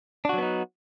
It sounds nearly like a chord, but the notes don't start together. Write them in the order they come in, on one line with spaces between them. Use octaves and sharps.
D4 F#4 F#3 B3 D#4